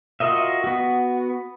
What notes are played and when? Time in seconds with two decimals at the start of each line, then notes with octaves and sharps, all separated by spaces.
0.20 F4 F#4 A#4 D#5 E5
0.64 B3 F#4